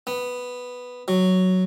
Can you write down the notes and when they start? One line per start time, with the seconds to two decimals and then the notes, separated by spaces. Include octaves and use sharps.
0.07 B3
1.08 F#3